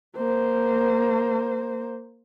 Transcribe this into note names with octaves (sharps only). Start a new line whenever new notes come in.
A#3 C5